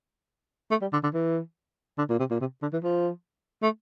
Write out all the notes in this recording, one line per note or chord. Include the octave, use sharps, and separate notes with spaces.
A3
G3
D3
D3
E3
D3
A#2
C3
A#2
C3
D3
E3
F3
A3